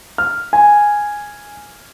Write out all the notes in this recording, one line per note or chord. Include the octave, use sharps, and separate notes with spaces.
F6
G#5